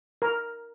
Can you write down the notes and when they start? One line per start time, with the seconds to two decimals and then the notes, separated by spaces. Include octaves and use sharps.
0.22 A#4